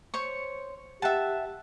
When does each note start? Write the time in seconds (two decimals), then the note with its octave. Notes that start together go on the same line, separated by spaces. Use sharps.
0.14 C5 C#5 C#6
1.02 G4 E5 F#5 G5 A5 F#6